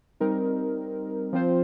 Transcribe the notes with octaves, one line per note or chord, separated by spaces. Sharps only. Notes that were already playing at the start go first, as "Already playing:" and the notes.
G3 C4 D#4 A#4
F3 C4 F4 C5